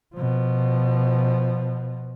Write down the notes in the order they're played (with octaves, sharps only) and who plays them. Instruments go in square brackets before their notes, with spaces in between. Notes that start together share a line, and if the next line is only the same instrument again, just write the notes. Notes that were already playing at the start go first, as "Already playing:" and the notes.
[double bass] B2 F3